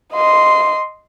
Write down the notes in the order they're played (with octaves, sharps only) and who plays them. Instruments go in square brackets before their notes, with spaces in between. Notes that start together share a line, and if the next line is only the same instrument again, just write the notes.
[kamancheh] D#5 C6